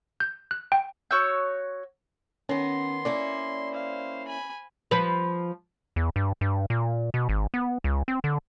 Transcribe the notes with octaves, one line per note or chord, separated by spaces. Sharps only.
G6
F#6
G5
F#4 C#5 E6 G6
D#3 B3 C#4 C6
A#3 C#4 E4 D5
C5 F5
G#5 B5
F3 B4
E2
G2
G2
A#2
B2
G#1
B3
C#2
C4
D3